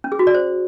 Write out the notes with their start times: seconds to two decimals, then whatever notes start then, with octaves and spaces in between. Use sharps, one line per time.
0.04 C#4
0.12 G#4
0.19 F#4
0.27 D5
0.34 C5